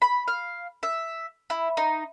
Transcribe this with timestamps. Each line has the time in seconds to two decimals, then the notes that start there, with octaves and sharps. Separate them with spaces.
0.02 B5
0.28 F5
0.83 E5
1.50 E4
1.77 D#4